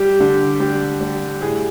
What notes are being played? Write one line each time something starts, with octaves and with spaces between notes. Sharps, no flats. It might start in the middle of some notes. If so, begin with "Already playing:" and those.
Already playing: G3 G4
D3
G3
G3
A2 G#4